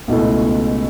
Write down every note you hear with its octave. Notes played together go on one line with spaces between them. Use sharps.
C#2 B2 A3 E4